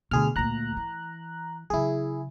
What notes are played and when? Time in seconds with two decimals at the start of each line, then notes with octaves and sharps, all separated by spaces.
0.11 D2 B2 G#4 F6
0.36 D2 A#2 A#5 F#6
0.77 E3
1.70 C#3 F#3 E4 G#4